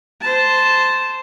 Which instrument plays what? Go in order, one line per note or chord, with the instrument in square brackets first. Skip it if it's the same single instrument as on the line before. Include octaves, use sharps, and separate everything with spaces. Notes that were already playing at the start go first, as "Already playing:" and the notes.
[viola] C5 A5